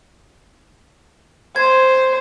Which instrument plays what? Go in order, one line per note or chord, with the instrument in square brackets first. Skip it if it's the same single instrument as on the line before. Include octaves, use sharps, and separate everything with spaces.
[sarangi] C5 [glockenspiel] G#6